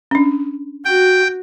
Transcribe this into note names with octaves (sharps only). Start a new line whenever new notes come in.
C#4 D4
F#4 G5